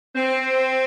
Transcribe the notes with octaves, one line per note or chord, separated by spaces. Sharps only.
C4